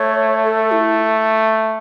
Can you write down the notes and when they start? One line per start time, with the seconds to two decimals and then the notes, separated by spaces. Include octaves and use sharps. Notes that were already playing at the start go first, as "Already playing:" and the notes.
Already playing: A3 C#5
0.44 A4
0.71 E4